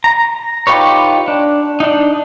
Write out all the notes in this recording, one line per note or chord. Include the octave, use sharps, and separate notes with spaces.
A#5
D#4 F4 G4 B4 C#5
D4
D4 D#4